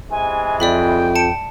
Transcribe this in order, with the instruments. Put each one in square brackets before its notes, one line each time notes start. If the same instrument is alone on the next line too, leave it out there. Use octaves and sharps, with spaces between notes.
[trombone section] C3 E3 G#3 [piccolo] G#5
[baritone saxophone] F2 [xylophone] D5 E5 B5 [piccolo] G5
[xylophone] A5 C#7 D7